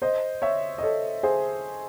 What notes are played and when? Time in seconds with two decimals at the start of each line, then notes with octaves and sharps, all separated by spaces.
0.02 C5 D#5
0.42 C#5 E5
0.78 D#5
0.83 A4 C#5
1.23 G#4 C5